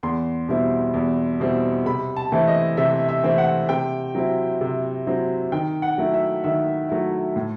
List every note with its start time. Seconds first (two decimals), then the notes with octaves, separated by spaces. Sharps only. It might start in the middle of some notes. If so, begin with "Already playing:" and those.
0.03 E2 C6
0.48 B2 G3 C4 E4
0.94 E2
1.40 B2 G3 C4 E4
1.86 C3 B5
2.17 A5
2.32 E3 A3 C4 E4
2.47 D#5
2.77 C3 E5
3.09 E5
3.23 E3 A3 C4 E4
3.38 F#5
3.69 C3 G5
4.15 F#3 C4 E4
4.61 C3
5.06 F#3 C4 E4
5.52 D#3 G5
5.82 F#5
5.98 F#3 A3 E4
6.14 E5
6.44 D#3 E5
6.89 F#3 A3 E4
7.36 A2